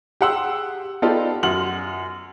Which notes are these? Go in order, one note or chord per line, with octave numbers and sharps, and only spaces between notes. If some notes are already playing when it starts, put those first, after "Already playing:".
G4 G#4 F#5 C6 E6
B3 D#4 F4 G4 A4 D5
F#2 F#4 C6 F6 F#7